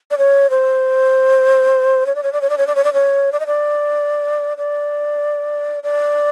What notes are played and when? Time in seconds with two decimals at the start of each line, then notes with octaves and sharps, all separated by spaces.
0.11 D5
0.18 C#5
0.50 C5
2.06 C#5
2.15 D5
2.23 C#5
2.33 D5
2.41 C#5
2.50 D5
2.58 C#5
2.67 D5
2.75 C#5
2.84 D5
2.93 C#5
3.32 D5
3.40 D#5
3.47 D5
4.58 D5
5.83 D5